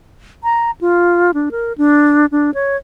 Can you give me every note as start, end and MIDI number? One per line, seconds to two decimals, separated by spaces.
0.44 0.71 82
0.81 1.31 65
1.34 1.49 62
1.51 1.73 70
1.78 2.26 62
2.32 2.51 62
2.54 2.77 73